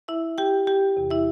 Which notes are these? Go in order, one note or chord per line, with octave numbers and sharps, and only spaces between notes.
E4 E5
G4 G5
G4 G5
E2 C3 E3
E4 E5